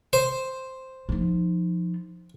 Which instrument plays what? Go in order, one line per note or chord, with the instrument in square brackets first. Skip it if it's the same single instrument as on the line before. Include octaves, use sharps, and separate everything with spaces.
[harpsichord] C5
[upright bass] F3 D#4